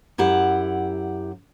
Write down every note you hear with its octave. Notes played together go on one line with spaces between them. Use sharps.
F#2 E4 G4 F#5